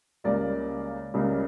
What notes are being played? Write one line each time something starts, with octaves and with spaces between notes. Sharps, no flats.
C#2 C#3 G3 A#3 D5
C#2 C#3 G3 A#3